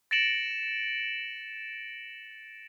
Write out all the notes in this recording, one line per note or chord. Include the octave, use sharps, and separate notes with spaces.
A6 A#6 C#7 D7 E7 F#7